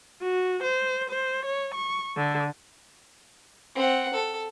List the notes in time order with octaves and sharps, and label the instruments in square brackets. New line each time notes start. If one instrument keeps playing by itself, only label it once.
[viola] F#4
C5
C5
C#5
C#6
D3
[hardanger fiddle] C4 F#5
A4